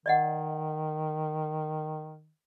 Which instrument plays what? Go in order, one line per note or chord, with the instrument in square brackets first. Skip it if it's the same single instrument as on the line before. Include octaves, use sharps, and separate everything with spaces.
[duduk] D#3 [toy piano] D5 D#5 F#5